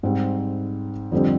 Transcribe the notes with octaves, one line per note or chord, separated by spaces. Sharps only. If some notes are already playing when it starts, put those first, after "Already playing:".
G#2 G3 C4
F2 D3 G3 C4